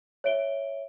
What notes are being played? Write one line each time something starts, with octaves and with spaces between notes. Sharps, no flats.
C#5 E5 D7 G7